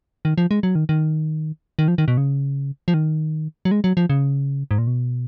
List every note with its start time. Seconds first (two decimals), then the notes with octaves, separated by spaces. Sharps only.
0.25 D#3
0.38 F3
0.51 G#3
0.63 F#3
0.75 D#3
0.89 D#3
1.79 D#3
1.88 F3
1.98 D#3
2.08 B2
2.17 C#3
2.88 F3
2.94 D#3
3.65 F#3
3.71 G#3
3.84 F#3
3.97 F3
4.10 C#3
4.71 G#2
4.78 A#2
4.87 B2